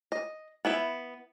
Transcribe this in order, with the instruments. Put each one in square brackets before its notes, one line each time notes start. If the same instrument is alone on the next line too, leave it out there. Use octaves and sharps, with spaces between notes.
[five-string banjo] D#5
B3 E4 E5